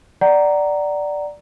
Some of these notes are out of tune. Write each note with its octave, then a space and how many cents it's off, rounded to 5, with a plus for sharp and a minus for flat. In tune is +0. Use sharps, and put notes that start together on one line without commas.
D5 +0 F#5 +25 A#5 +0